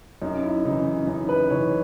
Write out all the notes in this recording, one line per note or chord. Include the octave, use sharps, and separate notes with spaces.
F#2 D#4
E4
C#3 E3 D#4
D#4
F#2 D#4
B4
C#3 E3 C#5